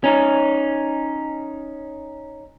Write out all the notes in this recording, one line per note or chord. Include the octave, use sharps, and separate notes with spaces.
C#4 D#4